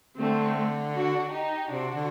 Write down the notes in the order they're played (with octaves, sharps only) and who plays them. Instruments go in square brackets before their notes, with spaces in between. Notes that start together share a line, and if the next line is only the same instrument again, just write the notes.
[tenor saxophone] D3 [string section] A3 C4
[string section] D4 F#4
D#4 G4
[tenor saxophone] C3 [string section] D4 F#4
[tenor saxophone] D3